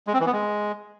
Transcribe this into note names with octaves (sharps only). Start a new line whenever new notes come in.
G#3
C4
E3
B3
G#3